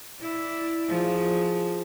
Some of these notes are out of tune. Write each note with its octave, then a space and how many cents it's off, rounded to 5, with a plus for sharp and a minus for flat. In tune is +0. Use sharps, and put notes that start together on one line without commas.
E4 +0 D5 -5
F3 +0 G#4 +0